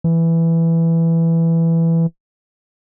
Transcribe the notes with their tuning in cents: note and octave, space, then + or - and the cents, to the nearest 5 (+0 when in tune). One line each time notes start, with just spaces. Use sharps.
E3 +5